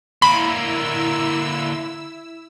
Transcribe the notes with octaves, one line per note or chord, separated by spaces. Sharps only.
D3 A#3 E4 B5 E6